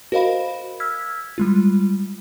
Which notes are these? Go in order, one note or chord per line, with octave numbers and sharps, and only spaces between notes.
F#4 A#4 C5 D#5 F5 B5
E6 F6 G#6 B6
G3 G#3 F4